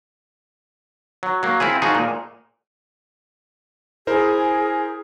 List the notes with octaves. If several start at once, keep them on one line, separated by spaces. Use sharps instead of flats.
F#3
F#3 A#3
C4 E4 F4 G#4
F3 D#4 F#4 G#4
A#2
E4 G#4 A#4 C5